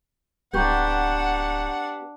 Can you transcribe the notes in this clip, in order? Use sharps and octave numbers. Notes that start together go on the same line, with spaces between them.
D1 B3 D4 G4 F#5 A#5 C#6 G6